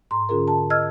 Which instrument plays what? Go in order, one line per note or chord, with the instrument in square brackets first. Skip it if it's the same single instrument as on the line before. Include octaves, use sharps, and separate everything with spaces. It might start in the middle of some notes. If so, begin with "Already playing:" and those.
[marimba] G#2 A#5 C6
D3 C#4 F4 G#4 A#4
A5
D#5 E6 F6 G#6